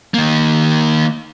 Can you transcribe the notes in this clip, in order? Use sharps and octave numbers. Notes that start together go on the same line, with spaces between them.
D#3 A#3